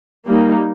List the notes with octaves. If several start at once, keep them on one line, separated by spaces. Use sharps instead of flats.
G3 A#3 D#4